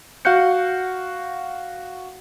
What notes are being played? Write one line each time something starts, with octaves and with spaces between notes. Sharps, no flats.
F#4 F5 F#5 F#6 G6 C#7